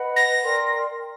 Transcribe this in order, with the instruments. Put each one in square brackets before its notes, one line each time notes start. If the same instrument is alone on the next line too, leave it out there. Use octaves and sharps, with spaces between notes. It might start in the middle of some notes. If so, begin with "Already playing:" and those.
Already playing: [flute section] B4 D#5 F#5 B5
[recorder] A#6
[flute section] A#4 D5 G5 C6